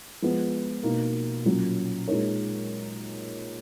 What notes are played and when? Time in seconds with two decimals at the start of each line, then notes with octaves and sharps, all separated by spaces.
0.22 F3 G#3 B3
0.83 B2 A#3 D#4
1.45 A#2 F#3 C#4
2.08 A#2 G#3 D#4 A#4 C#5